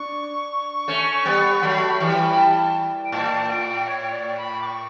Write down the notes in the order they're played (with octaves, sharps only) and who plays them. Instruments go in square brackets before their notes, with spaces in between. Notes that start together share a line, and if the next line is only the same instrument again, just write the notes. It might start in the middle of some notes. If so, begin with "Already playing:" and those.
Already playing: [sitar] D4 [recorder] C#6
[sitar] A3 C#4
G3 B3
[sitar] F#3 A3 [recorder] B5
[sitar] E3 G3 [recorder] C#6
[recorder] B5
A5
G5
[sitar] A2 [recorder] A5
[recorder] G5
C#5
D5
B5
D6
C#6